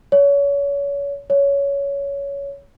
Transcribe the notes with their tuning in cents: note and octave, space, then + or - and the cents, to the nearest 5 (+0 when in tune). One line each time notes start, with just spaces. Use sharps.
C#5 +30
C#5 +15